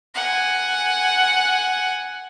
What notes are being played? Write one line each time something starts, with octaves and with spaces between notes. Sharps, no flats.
F#5 G#5